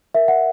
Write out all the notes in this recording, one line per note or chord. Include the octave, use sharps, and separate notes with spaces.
A#4 E5
F#5